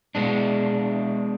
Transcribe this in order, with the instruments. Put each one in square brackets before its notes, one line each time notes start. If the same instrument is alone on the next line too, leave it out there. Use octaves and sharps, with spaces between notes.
[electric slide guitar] B2 G#3 D4